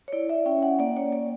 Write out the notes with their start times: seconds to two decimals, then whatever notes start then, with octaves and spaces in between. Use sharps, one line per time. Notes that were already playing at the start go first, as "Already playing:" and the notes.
0.08 C#5
0.13 E4 D5
0.29 E5
0.46 C#4 G5
0.62 F#5
0.79 A#3 D5
0.97 C#5
1.13 A#3 D5